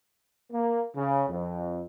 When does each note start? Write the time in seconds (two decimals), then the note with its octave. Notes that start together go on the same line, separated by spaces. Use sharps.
0.52 A#3
0.96 C#3
1.29 F2